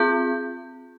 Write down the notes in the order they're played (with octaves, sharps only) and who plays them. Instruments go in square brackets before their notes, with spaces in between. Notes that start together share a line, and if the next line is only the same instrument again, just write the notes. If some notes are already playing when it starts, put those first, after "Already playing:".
Already playing: [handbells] C4 F4 G#4 G6